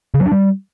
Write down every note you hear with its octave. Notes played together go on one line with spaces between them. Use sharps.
C#3
F#3
D4
G3